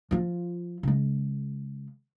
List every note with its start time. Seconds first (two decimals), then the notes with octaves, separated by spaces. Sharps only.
0.11 F3 F4
0.83 C#3 G#3